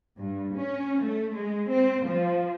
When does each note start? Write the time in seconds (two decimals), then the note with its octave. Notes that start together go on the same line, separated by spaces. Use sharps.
0.19 G2
0.54 C#4
1.02 A3
1.36 G#3
1.69 C4
2.06 F3